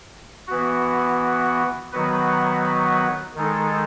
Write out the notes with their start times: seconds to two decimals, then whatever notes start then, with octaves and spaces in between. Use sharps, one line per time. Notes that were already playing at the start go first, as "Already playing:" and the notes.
0.47 E3 B3 F#4
1.92 D#3 F#3 B3 F#4 B4
3.36 D#3 G#3 D#4 A4